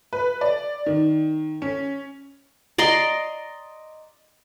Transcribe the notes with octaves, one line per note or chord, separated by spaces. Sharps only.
B4
D5
D#3
C#4
D5 D#5 A#5 C6